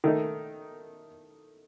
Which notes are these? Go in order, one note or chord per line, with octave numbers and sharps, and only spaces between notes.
D#3 A3 D#4